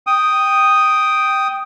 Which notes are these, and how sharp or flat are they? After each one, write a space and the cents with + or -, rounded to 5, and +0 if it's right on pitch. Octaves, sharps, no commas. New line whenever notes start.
G5 +0 D#6 +0